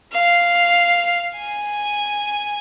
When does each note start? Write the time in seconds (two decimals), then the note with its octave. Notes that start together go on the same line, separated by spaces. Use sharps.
0.13 F5
1.36 G#5